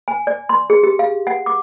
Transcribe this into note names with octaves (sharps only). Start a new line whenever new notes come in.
G#5
D5
C6
G#4
G4
F5
F#5
D6